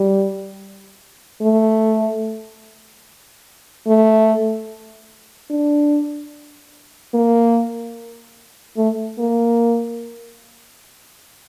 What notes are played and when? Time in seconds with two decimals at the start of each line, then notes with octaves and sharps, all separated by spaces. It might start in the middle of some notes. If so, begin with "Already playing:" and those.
Already playing: G3
1.41 A3
3.87 A3
5.50 D4
7.14 A#3
8.77 A3
9.19 A#3